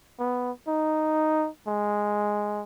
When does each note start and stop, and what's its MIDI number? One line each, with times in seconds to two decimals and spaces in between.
0.19 0.51 59
0.68 1.48 63
1.68 2.64 56